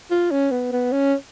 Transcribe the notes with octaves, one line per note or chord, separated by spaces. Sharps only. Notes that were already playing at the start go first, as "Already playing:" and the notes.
F4
C#4
B3
B3
C#4